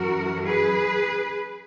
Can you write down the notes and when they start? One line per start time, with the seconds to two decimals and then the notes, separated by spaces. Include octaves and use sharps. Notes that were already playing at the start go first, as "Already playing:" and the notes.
Already playing: F#2 E3 F#4 A#4
0.45 G#4 B4